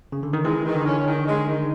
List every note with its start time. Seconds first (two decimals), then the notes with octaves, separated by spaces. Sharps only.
0.12 C#3
0.23 D3
0.33 D#3
0.44 E3 G#3
0.65 D#3
0.75 D3
0.86 C#4
1.07 D#3
1.27 G#3
1.47 D#3